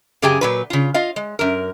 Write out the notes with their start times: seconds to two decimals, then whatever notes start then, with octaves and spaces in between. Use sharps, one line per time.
0.22 F#2 C#3 G4 G#4 G5 G#5
0.41 A#2 F#3 B4
0.70 C#3 F4
0.94 F4 D#5 F5
1.16 G#3
1.39 F#2 A#4